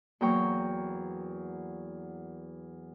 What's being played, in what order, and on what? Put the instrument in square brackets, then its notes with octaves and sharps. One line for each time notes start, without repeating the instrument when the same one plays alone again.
[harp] E2 F#3 A#3 G5 A#5 C#6